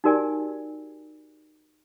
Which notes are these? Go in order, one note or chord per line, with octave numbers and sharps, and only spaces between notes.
D#4 F#4 G4 A#4 D5 G#5